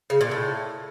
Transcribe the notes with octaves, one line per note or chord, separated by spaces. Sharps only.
C#3
A#2
A2